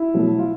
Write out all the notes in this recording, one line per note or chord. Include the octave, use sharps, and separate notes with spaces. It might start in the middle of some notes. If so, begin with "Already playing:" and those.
Already playing: E4
B2 F#3 A3
F4